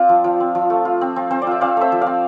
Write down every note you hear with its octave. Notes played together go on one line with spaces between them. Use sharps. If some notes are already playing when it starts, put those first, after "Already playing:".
Already playing: C4 F4 D5 F5
F3
F3
C4
F3
A3
F4
C4
C4
C4 C5
D5
F4 E5
C4 D5 F5
A3 C5 E5
F3
D5 F5
C4